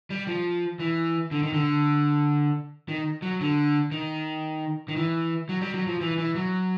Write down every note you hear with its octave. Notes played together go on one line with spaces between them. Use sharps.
G3
F3
E3
D3
D#3
D3
D#3
F#3
D3
D#3
D#3
E3
F#3
G3
F#3
F3
E3
E3
F#3